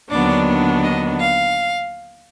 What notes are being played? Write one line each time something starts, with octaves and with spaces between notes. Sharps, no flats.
D#2 D3 F#3 B3 D4 D5
D#5
F5